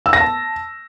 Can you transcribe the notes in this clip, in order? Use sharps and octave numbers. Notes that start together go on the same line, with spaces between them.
E6
A#6
A5